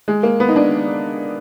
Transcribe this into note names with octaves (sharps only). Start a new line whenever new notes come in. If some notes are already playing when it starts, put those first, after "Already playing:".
G#3
A#3
B3
D#4
D4